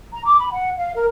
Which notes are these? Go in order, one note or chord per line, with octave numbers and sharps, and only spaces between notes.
A#5
D6
B5
F#5
F5
A#4